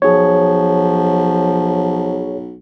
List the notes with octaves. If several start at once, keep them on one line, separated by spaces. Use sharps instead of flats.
B1 F3 G#4 C#5